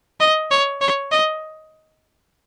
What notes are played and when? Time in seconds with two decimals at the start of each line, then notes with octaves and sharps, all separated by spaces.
0.20 D#5
0.51 C#5
0.81 C#5
1.12 D#5